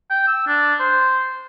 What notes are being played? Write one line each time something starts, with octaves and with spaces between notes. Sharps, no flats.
G5
E6
D4
C5